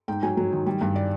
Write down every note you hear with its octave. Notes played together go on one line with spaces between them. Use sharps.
G#2 G5
F#3 G#5
F#3
D#3
G3
G2
D5